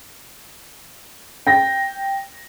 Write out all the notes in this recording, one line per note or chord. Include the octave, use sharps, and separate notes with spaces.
G5 A#6